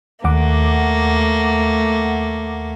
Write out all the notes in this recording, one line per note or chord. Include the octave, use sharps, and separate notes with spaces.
D#2 A3 A#3 F#5 D6